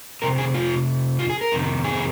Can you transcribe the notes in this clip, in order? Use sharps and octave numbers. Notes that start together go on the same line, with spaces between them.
F2 C3 A#4
G#4
F4
F4
G#4
A#4
F2 C3 D#3
G#4